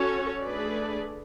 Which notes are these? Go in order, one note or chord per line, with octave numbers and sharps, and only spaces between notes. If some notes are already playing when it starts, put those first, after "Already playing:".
Already playing: C#4 F#4 A4 C#5
A3 D4 G#4 B4 D5